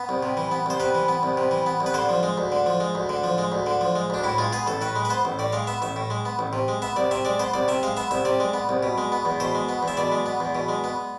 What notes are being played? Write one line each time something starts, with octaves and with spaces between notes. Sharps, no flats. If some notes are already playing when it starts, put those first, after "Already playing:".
Already playing: B3
C2
C3
E3
B3
C2 C5
C3 B4
E3
B3
C2
C3
E3
B3
C2
B4
D3 C5
F3
G#3
D2
D3
F3
G#3
D2
D3
F3
G#3
D2
D3
F3
G#3
D2 D4
A2 E4
G#3 F4
B3 G#4
A1 A4
A2 B4
G#3
B4
B3 C5
A1
A2 D5
G#3 F5
B3 E5
A1 E5
A2
G#3
B3
A1
C3
G#3
B3 E5
C2 D5
C3 E5
G#3 D5
B3 C5
C2 D5
C3 E5
G#3 F5
B3 E5
C2 E5
C3 D5
G#3
B3
C2
B2
G#3
B3
E2
B2 C5
G#3
B3
E2
E5
B2 D5
G#3
B3
E2
B2
G#3
B3